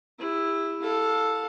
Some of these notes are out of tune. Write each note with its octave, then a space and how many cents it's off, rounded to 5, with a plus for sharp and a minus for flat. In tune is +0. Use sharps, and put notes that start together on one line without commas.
E4 +0 G4 +40
A4 +0 F5 +30